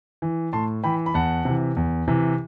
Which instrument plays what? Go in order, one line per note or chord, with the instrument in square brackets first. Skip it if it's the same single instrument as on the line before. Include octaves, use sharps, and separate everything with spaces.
[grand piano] E3
A2 A5 C6
E3 G5 B5
B5
E2 F#5 A5
C3 E3
E2
C3 E3